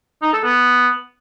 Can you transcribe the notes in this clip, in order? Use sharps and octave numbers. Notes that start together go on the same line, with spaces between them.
D#4
A4
B3